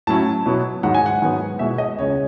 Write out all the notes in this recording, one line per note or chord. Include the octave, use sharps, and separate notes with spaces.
A2 F#3 C#4 E4 A5
B2 F#3 B3 E4
G#2 D#3 F#3 F#5
G#5
F#5
G#2 D#3 F#3 B3 D#4
B2 G#3 B3 E4 E5
D#5
C#2 C#3 G#3 C#5